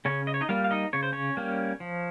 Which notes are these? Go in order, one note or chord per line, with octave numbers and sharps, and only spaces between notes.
C#3 C#4 C#5
D#5
C#5
D#4 D#5
G3 A#3 F4 F5
F5
D#4 D#5
C#3 C#5
C5
C#4 C#5
G3 A#3 C#4
F3